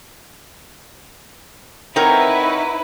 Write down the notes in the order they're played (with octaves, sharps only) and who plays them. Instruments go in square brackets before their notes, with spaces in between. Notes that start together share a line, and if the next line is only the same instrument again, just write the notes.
[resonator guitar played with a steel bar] C4 A#4 [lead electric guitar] D#4 C#5 [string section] E4 B4 [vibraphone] F#5 A#5